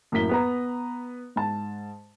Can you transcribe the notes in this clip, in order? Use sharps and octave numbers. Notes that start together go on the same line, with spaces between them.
F#2 A2 A#3 B6 G7
B3 B4 A#5
G#2 A5